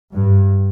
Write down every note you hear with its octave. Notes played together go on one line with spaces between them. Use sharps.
G2